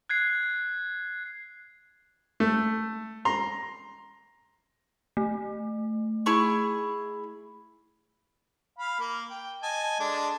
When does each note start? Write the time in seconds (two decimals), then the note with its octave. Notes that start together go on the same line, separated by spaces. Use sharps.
0.09 F#6 G#6 C7
2.40 A3
3.25 A#5 C6
5.17 A3
6.26 E4 G#4 C#6
8.79 F5 B5
8.99 A#3
9.30 G5
9.63 D#5 G#5 A5
10.00 G#3 D4 A4